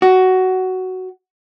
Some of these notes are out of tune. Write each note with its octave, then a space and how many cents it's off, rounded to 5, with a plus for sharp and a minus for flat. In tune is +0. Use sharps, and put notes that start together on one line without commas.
F#4 +10